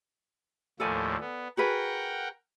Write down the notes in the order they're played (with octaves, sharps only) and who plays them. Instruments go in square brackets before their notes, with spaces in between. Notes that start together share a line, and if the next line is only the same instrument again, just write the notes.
[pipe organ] D#2 A2 F3 [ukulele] A4 D5 G#5
[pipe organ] B3
[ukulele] F#4 G#4 B4 [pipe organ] A#4 F#5 G5